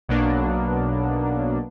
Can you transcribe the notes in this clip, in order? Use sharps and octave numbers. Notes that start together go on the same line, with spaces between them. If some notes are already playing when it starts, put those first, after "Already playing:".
B1 B2 F#3 A#3 B3 D4